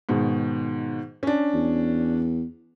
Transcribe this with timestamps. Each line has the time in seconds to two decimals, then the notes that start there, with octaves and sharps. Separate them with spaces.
0.09 G#2 B2 D#3
1.23 C#4 D4
1.54 E2